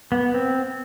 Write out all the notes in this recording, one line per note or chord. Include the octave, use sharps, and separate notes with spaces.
B3
C4